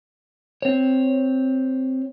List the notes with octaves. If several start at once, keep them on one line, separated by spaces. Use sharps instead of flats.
C4 C#5